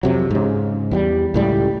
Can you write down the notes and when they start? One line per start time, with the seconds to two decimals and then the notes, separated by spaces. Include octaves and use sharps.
0.03 F2 C3 F#3
0.31 G#2 C#3
0.91 E2 F#3 G3
1.34 C#2 A2 G3